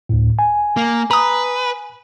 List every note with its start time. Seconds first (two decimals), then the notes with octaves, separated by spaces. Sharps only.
0.09 D2 A2
0.39 G#5
0.77 A#3
1.11 B4 A#5 D#6